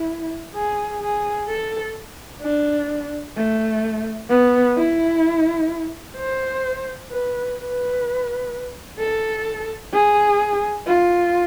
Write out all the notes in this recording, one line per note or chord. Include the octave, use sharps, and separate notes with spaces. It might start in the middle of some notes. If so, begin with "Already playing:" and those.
Already playing: E4
G#4
G#4
A4
D4
A3
B3
E4
C5
B4
B4
A4
G#4
F4